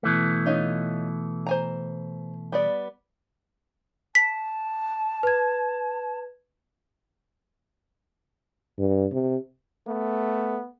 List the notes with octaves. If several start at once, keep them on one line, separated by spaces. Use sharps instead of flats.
B2 E3 A3
C#4 D#4 F4
C5 G#5 A#5
G3 B3 D5
A5 B6
B4 G#6
G2
C3
A3 B3